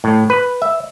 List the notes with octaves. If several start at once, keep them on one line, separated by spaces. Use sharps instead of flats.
A2
B4
E5